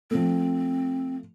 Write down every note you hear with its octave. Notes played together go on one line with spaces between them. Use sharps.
F3 A3 C4